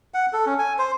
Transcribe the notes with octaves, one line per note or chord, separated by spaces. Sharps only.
F#5
A4
C#4
G#5
C5